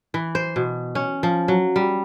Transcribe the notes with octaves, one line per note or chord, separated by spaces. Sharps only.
E3
C5
B2
C#4
F3
F#3
G3